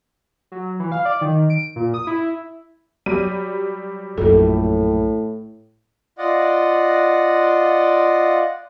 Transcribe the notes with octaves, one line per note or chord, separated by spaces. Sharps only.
F#3
E3
F5
D5
D#3
D7
A#2
D#6
E4
F#3 G3 D#7
A#1 F#2 A2 A4
F4 D5 D#5 F#5